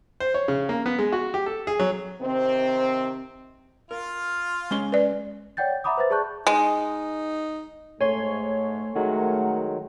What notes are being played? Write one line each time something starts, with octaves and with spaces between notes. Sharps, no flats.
C5
C#5
C#3
A#3
B3
G#3
F#4
G4
A4
G#4
F#3
C3 D#3 C4
F4 A#4 F5
G#3 C#4 C6
B4 D5
C#5 D5 F#5 G5 G6 A6
E5 F#5 A#5 B5 D6 D#6
B4 C5 E5 A6
G#4 D5 A5 C#6 F#6 G6
G#3 D#4
G#2 A3 C#5 G#5 C6
D#3 F#3 G#3 A3 A#4 F#5